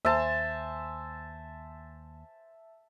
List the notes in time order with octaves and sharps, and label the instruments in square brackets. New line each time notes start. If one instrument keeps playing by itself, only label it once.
[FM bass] D#2 [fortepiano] C5 G#5 [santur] E5 A5